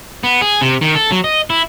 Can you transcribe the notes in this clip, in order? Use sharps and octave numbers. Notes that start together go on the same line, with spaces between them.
B3
G#4
C3
D#3
A4
F#3
D#5
E4